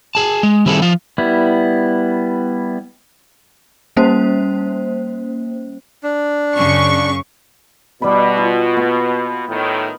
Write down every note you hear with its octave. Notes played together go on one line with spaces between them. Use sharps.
G#4 A5
G#3
D#3 G3 C4 E4 G#4 A4
F3 F4
G3 B3 E4
G3 A#3 C#4 C5
D4
F#2 C#3 C#6
B2 G3 B5
F4
B3
A2 D#3